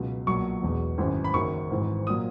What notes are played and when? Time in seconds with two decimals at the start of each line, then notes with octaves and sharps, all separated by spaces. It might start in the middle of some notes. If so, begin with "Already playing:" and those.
Already playing: C#2 B2 F#3
0.27 B1 A#2 F#3 C#6
0.62 E1 E2 B2
0.98 G#1 F#2 E3
1.24 B5
1.34 F#1 F#2 D#3 F#3 C#6
1.70 G#1 G#2 E3
2.07 A#2 F#3 D#6